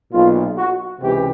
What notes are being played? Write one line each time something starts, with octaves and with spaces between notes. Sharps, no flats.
B1 A#2 F4
F#4
C#2 C3 E3 G4